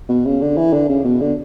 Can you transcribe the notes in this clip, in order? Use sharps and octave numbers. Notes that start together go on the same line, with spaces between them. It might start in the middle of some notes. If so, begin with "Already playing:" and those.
B2
C#3
D3
E3
D3
C#3
B2
D3